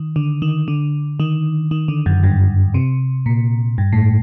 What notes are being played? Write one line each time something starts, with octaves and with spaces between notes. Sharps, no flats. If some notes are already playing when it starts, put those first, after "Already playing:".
Already playing: D#3
D3
D#3
D3
D#3
D#3
D3
F#2
G2
C3
A#2
G2
A2